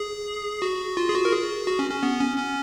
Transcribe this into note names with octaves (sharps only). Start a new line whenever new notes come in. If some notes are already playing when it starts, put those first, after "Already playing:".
Already playing: G#4
F#4
F4
G#4
F#4
A#4
G#4
F#4
C#4
C#4
B3
C#4
C#4